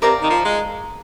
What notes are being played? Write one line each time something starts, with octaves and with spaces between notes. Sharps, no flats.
C3 A#4 D5 F5 A#5
D#3
F3
G#3